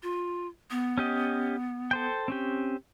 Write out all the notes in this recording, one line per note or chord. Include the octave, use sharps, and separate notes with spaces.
F4
B3
C#4 G4 D#5
A4 C5 G5
C4 C#4 G4